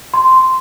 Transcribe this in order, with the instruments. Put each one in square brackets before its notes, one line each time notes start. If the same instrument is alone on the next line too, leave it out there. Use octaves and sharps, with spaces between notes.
[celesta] C6